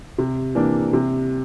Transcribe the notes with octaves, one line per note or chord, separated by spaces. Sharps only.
C3
E3 A#3 D4
C3